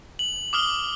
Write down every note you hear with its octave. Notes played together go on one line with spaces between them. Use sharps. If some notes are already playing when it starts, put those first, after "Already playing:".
F#7
D6 D#6 F6 G7